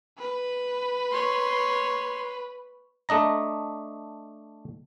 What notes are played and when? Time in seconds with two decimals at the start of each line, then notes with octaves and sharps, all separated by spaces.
0.18 B4
1.11 C#5 C6
3.09 A3 D4 D#5 A#5